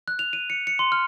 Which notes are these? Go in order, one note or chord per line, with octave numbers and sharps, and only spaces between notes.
F#6
F7
D#7
C#7
C#7
C6
F6